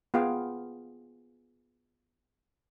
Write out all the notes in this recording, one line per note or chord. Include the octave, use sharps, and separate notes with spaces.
B3 F4 G#4 F5 G5